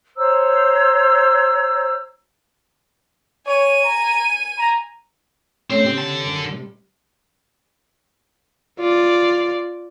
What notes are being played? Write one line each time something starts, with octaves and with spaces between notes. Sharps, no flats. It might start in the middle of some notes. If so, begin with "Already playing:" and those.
C5 C#5 A#5 E6
C#5 G#5 D#7
A#5
A#5
A3 C4 C#4 C#5
C#3 B3 G4
D3 A5
F#2 G3
C3 G3
F4 D5